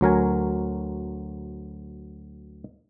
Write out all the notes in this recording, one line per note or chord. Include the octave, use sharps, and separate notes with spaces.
D2 F#3 A#4 G#5